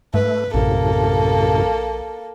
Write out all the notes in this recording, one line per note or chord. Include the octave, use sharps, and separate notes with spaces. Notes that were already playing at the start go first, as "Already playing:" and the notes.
G#2 A3 B4
A#1 F#2 A2 C3 A#3 A4